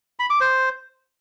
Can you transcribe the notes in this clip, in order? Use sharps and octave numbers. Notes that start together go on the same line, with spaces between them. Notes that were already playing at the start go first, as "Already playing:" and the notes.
B5
D6
C5